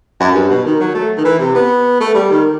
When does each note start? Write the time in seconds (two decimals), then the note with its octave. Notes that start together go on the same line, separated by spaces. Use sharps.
0.20 F#2
0.35 G2
0.50 B2
0.65 D#3
0.80 F#3
0.95 A3
1.17 D#3
1.25 E3
1.39 C3
1.55 B3
2.00 A3
2.14 G3
2.31 D#3